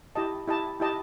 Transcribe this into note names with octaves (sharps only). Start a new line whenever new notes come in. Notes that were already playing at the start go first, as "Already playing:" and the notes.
E4 G4 D#5 A5
E4 G4 D#5 A5
E4 G4 D#5 A5